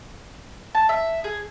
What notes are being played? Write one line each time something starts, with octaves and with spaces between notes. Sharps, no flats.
A5
E5
G#4